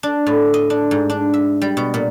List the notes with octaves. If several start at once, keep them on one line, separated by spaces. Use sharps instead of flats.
D4
A2
D#5
D4
G#2
D4
E5
G3
B2
A#2